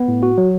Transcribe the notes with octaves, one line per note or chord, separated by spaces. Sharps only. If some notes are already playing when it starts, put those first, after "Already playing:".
Already playing: B3
A2
F#4
F#3